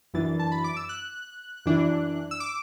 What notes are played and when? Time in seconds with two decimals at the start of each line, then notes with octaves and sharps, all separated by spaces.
0.14 F#2 E3 B3 D4 A6
0.39 A5
0.52 B5
0.64 D6
0.76 E6
0.89 F#6
1.66 F#2 E3 D4
2.31 E6
2.40 D6